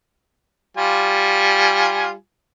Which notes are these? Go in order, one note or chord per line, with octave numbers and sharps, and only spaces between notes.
G3 F4 G#5